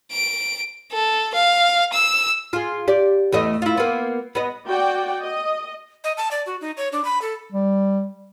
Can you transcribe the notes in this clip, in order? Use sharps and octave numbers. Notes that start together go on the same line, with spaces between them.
D7
A4
F5
E6
F4 G#4
G4 D5
E2 A3 D#5
E4 F4
A#3 B3
B3 D#5
F#4 D5 G5
D#5
D#5
A5
D5
F#4
D#4
C#5
D4
B5
A4
G3